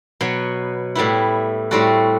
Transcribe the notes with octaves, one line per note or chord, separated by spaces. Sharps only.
B2 F#3 B3
A2 G3 B3 E4
A2 G3 C4 F#4 A4